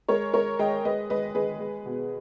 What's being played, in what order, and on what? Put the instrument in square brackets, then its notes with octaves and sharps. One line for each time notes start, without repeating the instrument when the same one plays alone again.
[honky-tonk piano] G#3 A#4 C#5
G#3 A#4 C#5
G#3 D#5 G5
G#3 B4 D#5
G#3 B4 D#5
G#3 G#4 B4
G#3
B2